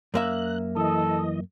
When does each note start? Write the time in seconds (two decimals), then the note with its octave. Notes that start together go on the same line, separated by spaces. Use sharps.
0.14 F#2 A#3 E5 F#6
0.76 E3 A4 D#5